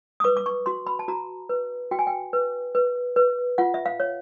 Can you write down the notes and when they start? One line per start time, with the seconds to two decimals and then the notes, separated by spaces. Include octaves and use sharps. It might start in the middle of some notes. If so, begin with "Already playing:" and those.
0.20 D#6
0.24 B4 D6
0.37 D6
0.46 C#6
0.66 F#4 C6
0.87 B5
0.99 A5
1.08 F#4 A#5
1.49 B4
1.91 F#4 G5
1.99 G#5
2.07 G5
2.33 B4
2.75 B4
3.16 B4
3.58 F4 F#5
3.74 E5
3.86 F5
4.00 C#5